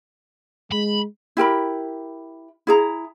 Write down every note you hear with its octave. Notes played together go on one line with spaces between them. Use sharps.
G#3 B5
E4 G4 A#4 B5
E4 G#4 A#5